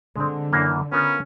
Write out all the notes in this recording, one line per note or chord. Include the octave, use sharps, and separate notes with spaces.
D3 G#3 C4
F#2 E3 A#3
B3 C#4 F4 A#4